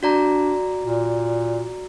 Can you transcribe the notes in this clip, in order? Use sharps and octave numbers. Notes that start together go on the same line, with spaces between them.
D4 F#4 D5 A#5
A#2